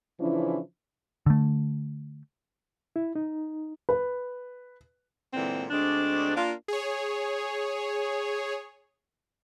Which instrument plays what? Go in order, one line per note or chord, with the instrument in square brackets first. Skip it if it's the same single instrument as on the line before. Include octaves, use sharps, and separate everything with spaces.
[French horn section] C#3 E3 F3 C#4 D4 E4
[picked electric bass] D3 A3
[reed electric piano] E4
D#4
[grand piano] B4
[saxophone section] A#2 D3 E3 G#3 C4
D2 G#3 C4 D4
A#3 D4 F4
[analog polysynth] G#4 C#5